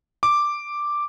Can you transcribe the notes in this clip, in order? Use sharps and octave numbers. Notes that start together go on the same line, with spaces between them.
D6